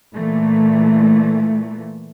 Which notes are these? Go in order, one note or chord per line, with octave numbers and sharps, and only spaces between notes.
A#2 E3 A3